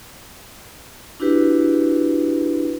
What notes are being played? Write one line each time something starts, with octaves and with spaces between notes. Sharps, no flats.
D4 E4 F#4 G4 B4